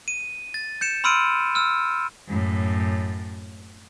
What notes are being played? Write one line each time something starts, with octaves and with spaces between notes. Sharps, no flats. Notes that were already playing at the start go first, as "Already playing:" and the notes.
D#7
A6
G6 C#7 E7
B5 C6 E6 F6 D7 D#7
E6 F6
F#2 A2